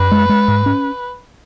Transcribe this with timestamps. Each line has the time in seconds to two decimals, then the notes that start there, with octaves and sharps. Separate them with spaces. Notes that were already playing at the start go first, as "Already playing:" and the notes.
Already playing: F#2 B4
0.11 G#3
0.29 G#3
0.48 G#2
0.66 C#4